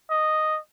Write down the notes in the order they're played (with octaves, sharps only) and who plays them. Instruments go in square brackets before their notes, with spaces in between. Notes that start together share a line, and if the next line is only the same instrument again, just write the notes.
[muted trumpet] D#5